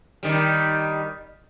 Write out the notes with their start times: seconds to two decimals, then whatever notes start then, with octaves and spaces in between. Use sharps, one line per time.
0.23 D#3 G3